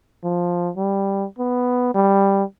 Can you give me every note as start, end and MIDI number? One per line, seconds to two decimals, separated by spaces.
0.24 0.69 53
0.77 1.25 55
1.39 1.93 59
1.94 2.44 55